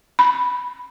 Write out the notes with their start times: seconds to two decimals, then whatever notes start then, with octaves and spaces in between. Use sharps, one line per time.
0.19 B5